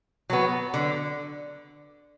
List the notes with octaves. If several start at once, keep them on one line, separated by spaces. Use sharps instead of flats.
F#3 B3
D3